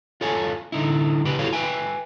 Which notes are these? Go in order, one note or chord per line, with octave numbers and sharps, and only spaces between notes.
F4 A4 C#5 F5 G#5
D3 D#4 E4
C#3 G4 B4
E4 F#4 A4 C#5 F5
B4 E5 G5 G#5